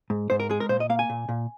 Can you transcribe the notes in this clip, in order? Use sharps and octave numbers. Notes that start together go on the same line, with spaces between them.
G#2
G#2 C5
A#4
G#3 G#4
A#4
A#2 C5
D#5
A#3 F5
G#5
A#2
A#2